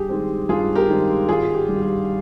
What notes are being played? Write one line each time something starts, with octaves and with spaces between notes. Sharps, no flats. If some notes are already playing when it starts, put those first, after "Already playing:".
Already playing: G2 G4 G#4
D#3 G#3 C4
G2 F4 G#4
G4 A#4
D#3 G#3 C4
G#1 F4 G#4
G4
G2 D#3 G3
G4